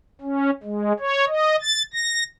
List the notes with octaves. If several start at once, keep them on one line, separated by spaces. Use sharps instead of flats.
C#4
G#3
C#5
D#5
A6
A#6